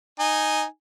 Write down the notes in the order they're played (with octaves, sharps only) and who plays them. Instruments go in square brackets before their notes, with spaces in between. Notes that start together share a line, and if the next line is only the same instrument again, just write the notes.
[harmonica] D#4 G#5